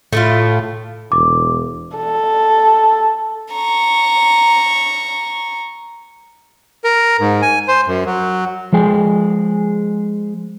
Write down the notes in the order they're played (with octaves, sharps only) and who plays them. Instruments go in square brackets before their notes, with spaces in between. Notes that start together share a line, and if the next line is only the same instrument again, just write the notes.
[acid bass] A2 [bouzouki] A3 E4 F4
[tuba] E1 [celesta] D6
[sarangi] A4
[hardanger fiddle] A#5 C#6
[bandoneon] A#4
G#2
G#5
C5
F#2
F#3
[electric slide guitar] F3 G#3 G#4 G5